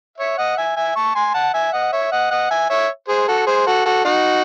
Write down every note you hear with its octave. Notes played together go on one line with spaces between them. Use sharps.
C#5 E5
D#5 F#5
E5 G#5
E5 G#5
A5 C#6
G#5 C6
F#5 A5
E5 G#5
D#5 F#5
C#5 E5
D#5 F#5
D#5 F#5
E5 G#5
C#5 E5
G#4 C5
F#4 A4
G#4 C5
F#4 A4
F#4 A4
D#4 F#4